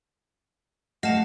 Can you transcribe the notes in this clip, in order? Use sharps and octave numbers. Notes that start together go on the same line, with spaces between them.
A3 D#5 F5 F#5 A5